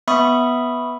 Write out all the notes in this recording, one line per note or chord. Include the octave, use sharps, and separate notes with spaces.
B3 E5 B5 C#6 D#6